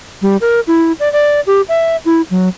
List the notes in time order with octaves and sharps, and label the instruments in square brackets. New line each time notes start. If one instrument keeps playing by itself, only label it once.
[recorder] G3
A#4
E4
D5
D5
G4
E5
E4
F#3